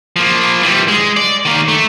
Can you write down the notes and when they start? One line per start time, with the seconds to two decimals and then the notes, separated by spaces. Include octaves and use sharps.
0.16 F3 A#3
0.63 E3 G3
0.88 G#3
1.17 D5
1.45 D#3 A#3
1.68 A3